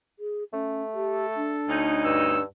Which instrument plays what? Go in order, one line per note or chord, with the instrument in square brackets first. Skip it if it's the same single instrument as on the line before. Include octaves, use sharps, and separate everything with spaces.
[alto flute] G#4
[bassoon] A3 [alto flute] C#4
[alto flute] G4 [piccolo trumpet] A4
[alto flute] D4
[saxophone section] D2 C#4 D#4
[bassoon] G2 [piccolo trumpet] E6